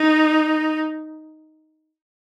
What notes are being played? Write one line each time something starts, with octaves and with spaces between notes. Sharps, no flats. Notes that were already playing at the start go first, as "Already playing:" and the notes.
Already playing: D#4